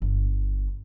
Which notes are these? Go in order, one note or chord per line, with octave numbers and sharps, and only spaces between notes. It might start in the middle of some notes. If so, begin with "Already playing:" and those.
G1